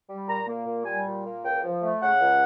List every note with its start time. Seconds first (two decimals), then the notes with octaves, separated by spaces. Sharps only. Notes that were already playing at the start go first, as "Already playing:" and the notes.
0.09 G3
0.28 A#2 A#5
0.47 A#3
0.67 A#2
0.85 G3 G#5
1.05 A#2
1.24 A#3
1.43 C#2 G5
1.63 F3
1.82 A3
2.01 C#3 F#5
2.20 C#2